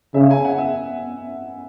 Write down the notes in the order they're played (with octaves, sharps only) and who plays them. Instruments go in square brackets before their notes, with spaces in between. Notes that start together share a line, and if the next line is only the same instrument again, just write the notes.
[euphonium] C#3 [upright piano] E5
[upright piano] G#5
F#5
E5